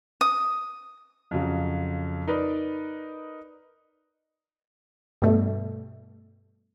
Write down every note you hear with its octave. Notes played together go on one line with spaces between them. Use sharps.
D#6
F2 C#3 F#3
D#4 A#4 B4 D5 D#5
G2 B2 A3